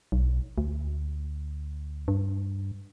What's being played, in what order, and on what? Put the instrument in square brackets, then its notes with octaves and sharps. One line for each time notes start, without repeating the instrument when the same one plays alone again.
[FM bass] B1
D2
G2